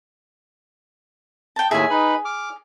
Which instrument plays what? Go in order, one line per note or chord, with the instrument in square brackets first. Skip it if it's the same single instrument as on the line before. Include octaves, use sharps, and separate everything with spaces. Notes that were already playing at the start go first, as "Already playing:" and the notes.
[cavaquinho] G5 A5
[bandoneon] D#2 A2 E5 [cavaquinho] G#4 G#5
[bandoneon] D#4 B4 B5
D6 F6